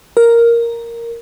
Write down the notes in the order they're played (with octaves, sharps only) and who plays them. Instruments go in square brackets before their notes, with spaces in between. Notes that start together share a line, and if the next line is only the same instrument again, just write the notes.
[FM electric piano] A#4